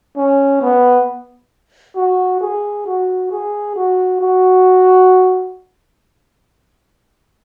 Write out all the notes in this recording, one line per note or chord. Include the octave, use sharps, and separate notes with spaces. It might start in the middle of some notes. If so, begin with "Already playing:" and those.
C#4
B3
F#4
G#4
F#4
G#4
F#4
F#4